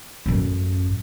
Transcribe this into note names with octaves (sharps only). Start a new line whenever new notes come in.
A1 F#2